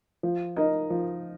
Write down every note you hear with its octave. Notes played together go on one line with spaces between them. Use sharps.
F3
D#4 A#4 D#5
F3